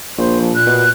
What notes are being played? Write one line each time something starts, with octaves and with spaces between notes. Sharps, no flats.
A#1 C5
F3
A#2 F#6
B2